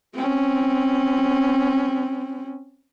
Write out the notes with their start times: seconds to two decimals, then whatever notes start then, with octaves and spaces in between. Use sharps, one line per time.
0.14 C4 C#4